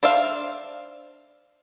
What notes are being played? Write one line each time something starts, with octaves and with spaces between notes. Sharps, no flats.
D4 C5 E5 F5